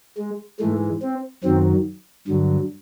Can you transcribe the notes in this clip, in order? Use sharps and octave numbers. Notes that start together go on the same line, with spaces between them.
G#3
G#2 E3 G#3 A3
C4
F#2 D#3 F#3 C4
G2 D3 F#3